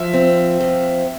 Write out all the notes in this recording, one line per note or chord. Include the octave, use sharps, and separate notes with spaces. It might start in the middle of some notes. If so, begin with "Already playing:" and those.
Already playing: F3 E5
C4
F3